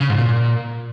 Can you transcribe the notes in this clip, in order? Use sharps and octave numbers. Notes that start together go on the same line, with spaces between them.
C#3
G#2
A#2